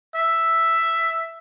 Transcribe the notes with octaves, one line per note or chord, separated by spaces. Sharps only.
E5